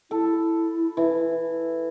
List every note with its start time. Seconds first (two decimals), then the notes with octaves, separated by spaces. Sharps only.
0.11 E4 A4
0.97 E3